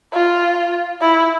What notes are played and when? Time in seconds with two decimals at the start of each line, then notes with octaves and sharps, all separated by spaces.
0.13 F4
1.01 E4